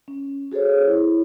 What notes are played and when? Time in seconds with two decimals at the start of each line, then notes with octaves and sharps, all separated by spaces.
0.08 C#4
0.52 F#4 G#4 A4 C5 C#5
0.86 E4